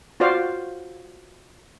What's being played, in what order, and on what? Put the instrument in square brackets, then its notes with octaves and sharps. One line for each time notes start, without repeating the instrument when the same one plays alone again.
[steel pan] F4 F#4 C5 D5 F5